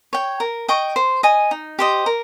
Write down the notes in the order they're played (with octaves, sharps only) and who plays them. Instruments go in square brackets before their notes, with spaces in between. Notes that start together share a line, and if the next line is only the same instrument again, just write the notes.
[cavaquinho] C#5 G5
A#4
D#5 G5 C#6
C5
D#5 G#5
D#4
G4 C5 D#5
A#4